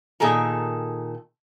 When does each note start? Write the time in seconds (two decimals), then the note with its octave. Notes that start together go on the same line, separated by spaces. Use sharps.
0.20 A#2 D#3 G#4 A4 A#5